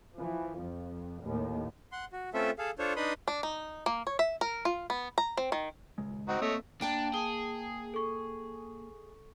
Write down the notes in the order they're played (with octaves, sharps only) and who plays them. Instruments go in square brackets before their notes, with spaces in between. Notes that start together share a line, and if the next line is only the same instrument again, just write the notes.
[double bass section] E3 F3
F2
D#2 A2
[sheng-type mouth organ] F#5 C6
F#4
A3 C4 C#4 F4 A4 E5
G#4 A4 F5
D4 F4 A4 C5 C#5
D4 D#4 B4 B5 C6 D#6
[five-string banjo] D4
D#4
A#3
C#5
E5
A#4
F4
B3
A#5
C4
D#3
[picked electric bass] D#1 C#2 G#3
[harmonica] C4 D#4 F#4
[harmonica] A3 C#5 D#5 [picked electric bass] A#3 C4
[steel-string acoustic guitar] A#3 G5 A5 [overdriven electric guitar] D4
[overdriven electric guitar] G#4 [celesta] G7
[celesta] A4 C#6